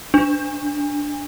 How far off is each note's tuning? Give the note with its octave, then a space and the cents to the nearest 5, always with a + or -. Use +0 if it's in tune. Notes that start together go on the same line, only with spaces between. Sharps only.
D4 +0